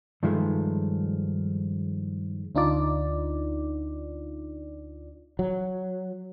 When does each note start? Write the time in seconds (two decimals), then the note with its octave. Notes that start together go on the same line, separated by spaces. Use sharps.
0.23 G2 D#3 F3 G#3 A3
2.55 D2 D4 D#4 F4 D5
5.39 F#3